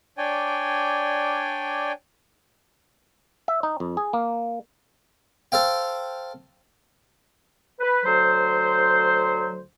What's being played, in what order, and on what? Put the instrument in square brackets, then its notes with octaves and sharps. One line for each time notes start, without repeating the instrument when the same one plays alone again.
[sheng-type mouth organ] D4 C#5 D5 G5 G#5
[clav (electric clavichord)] E5
D#4
F2
G#4
A#3
[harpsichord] A4 C5 F5 G5
[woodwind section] B4
D2 F#3 C5